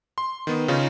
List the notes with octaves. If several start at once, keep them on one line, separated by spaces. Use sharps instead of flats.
C6
D#3 B3
C#3 C#4 D#4 F4